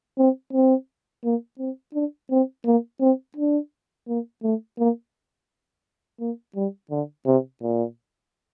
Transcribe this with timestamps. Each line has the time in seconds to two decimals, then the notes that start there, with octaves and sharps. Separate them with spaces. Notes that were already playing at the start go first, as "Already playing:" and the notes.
0.18 C4
0.53 C4
1.24 A#3
1.59 C4
1.94 D4
2.31 C4
2.66 A#3
3.01 C4
3.36 D4
4.08 A#3
4.43 A3
4.79 A#3
6.20 A#3
6.55 G3
6.91 D3
7.26 C3
7.62 A#2